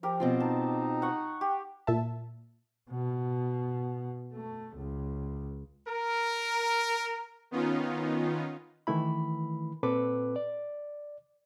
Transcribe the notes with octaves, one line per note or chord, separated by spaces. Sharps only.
F3 G4 A#4
B2 C4 F4
D#4 A5
F#5 C#6
G4
A#2 E5 A5
B2
A3
C#2
A#4
D#3 B3 C#4 D#4 F4
D#3 E3 A3 E4 B5
A#2 C4 A4 B4 D6
D5